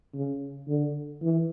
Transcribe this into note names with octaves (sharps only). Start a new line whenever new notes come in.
C#3
D3
E3